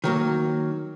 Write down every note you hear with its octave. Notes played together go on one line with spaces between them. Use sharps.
D#3 F#3 A#3